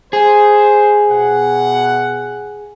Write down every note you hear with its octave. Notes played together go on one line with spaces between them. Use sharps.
G#4 C5
B2 F#5